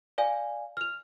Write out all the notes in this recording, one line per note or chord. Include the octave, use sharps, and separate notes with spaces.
D5 F5 G#5
F6 F7